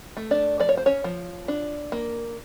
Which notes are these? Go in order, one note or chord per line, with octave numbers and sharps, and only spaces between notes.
A3
D4 D5
F3 D5
C#5
C5
C#4 C#5
F3
D4
A#3